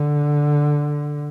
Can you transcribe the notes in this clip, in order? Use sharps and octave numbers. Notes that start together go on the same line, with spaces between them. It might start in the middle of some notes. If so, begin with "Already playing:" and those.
Already playing: D3